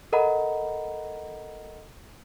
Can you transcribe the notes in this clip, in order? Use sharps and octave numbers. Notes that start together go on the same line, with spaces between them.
A4 A#4 D#5 F#5 A#5 B5